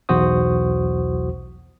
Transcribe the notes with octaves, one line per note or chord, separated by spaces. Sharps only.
B1 E2 F#4 C5 D#6